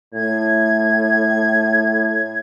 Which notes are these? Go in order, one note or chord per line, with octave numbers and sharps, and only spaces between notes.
A2 G#6